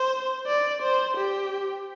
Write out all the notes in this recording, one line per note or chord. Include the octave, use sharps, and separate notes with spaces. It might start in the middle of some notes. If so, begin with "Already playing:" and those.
Already playing: C5
D5
C5
G4